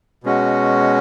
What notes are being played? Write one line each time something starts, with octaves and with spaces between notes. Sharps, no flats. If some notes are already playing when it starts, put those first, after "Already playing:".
B2 G#3 C#4 F#4